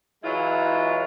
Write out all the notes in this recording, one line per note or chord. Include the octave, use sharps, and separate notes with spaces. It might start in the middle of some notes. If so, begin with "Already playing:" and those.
E3 F#3 G#3 E4 F4